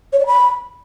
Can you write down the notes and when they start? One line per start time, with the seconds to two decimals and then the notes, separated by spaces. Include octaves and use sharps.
0.13 C#5
0.20 D5
0.27 B5